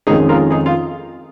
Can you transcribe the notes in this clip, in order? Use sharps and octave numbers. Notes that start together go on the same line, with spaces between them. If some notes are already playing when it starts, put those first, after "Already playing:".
F2 D#3 G#3 C#4 D#4 G#4
F4 A#4
D#4 G#4
F4